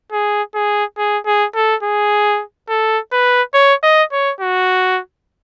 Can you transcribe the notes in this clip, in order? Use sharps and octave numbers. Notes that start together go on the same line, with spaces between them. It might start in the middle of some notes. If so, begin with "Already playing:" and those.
G#4
G#4
G#4
G#4
A4
G#4
A4
B4
C#5
D#5
C#5
F#4